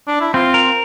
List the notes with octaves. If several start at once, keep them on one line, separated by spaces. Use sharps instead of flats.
D4
E4
C4 F4
A#4